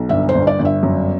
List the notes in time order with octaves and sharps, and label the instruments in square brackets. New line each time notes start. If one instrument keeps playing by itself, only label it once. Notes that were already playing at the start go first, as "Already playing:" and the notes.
Already playing: [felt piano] B1
G1 E5
C5
G1
D5
G1
E5
F#2